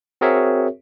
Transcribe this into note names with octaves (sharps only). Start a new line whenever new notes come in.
C4 F#4 G#4 A#4 C#5 E5